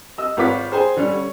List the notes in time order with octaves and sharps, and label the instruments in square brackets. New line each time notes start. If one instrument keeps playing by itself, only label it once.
[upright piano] D#5 E6
G#1 F4 B4 C#5 D6 B6
G#4 C5 G5 G#5
D3 G3 C#4
C#5